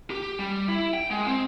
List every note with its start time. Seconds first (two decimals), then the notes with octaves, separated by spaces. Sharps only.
0.10 G4
0.39 G3
0.68 E4
0.93 G5
1.10 G#3
1.26 C4